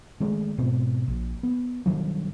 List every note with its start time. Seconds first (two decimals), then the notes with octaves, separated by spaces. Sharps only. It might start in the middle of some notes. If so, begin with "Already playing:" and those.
0.20 D#3 G#3 A3
0.58 G#2 B2 C4
1.08 A#1
1.43 B3
1.86 G2 D#3 F#3